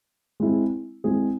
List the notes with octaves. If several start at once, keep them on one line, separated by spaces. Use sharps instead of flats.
G#3 C4 E4 G#4
G#3 C4 E4 G#4